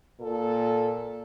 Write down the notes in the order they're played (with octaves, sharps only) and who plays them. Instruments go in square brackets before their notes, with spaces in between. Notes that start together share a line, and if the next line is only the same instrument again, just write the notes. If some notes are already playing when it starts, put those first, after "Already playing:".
[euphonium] A#2 [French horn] A4